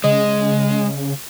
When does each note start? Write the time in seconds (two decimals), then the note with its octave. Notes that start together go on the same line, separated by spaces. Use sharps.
0.04 C#3 G#3 D#5